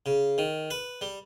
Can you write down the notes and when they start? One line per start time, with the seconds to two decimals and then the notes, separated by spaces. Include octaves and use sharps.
0.06 C#3
0.38 D#3
0.71 B4
1.01 G3